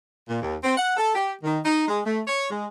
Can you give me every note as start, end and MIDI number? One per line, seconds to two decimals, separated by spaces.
0.29 0.40 46
0.42 0.56 39
0.63 0.73 60
0.77 0.94 78
0.97 1.15 69
1.15 1.33 67
1.44 1.59 51
1.65 1.86 63
1.88 2.00 56
2.05 2.21 57
2.27 2.48 73
2.50 2.66 56